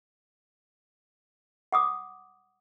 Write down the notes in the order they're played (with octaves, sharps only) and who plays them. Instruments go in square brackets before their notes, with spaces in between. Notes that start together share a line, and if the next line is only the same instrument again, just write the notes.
[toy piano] F#5 D6 D#6